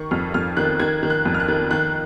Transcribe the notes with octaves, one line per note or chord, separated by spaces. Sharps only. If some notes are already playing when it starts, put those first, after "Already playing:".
Already playing: D#3 C#6
F2 F6
F2 F6
D#3 F#6
D#3 G#6
D#3
F#6
F2
F6
F#6
D#3
D#3 F#6